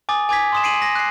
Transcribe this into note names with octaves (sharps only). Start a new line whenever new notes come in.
G#5 D6 D#6 A6
G#5 D6 G#6 B6
C6 D#6 E7
C7 D7 D#7 F#7
A#6
F#6 C7